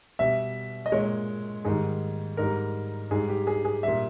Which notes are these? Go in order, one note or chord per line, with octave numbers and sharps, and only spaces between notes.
B2 G3 E5
D#5
A#2 G#3 C#5
G#2 D#3 G3 G#4
G#2 G3 A#4
G#2 G3 G#4
G4
G#4
G#4
A#2 G3 E5